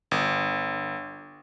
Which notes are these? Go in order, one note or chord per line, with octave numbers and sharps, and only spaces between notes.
G1